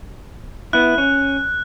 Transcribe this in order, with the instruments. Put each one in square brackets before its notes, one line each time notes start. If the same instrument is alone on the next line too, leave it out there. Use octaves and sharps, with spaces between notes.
[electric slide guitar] B3 E4 [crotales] F#6
[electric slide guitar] C#4